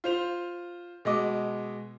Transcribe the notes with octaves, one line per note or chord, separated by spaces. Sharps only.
F4 C5 F7
B2 G#3 D#5 D6